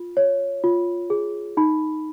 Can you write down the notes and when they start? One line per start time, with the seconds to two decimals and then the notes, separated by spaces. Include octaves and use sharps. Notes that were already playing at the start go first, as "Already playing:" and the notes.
Already playing: F4
0.17 C#5
0.64 F4
1.10 G#4
1.57 D#4 B5